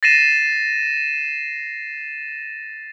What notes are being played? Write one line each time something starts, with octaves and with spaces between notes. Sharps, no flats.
A6 A#6 C7 D#7 E7